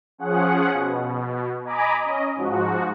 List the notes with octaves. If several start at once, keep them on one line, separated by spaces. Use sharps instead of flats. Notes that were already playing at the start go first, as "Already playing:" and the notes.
F3 C#4 G#4 F#5
B2
D#5 G#5 A#5 B5 D6
C#4 D#5
G#2 F3 F#4